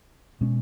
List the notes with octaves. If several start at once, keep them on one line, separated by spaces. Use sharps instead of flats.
B2 G#3 C#4